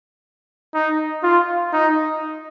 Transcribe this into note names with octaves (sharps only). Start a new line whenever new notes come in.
D#4
F4
D#4